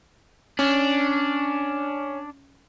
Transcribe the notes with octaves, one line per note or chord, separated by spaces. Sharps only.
C#4 D4